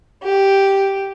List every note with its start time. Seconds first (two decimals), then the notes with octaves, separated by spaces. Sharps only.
0.23 G4